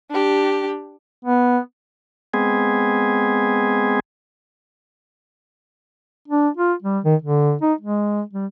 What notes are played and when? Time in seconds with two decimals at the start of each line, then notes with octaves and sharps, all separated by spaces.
0.10 D4 G4
1.25 B3
2.34 G#3 B3 C4 G#4
6.28 D4
6.57 F4
6.82 G3
7.04 D#3
7.22 D3
7.61 D#4
7.81 G#3
8.33 G3